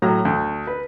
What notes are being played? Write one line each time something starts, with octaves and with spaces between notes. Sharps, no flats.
A2 F#3 A#5
D2
B4